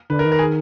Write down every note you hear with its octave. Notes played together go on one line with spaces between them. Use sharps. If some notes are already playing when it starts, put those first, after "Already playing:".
D3 B4
A#4
D#3
A#4
G#4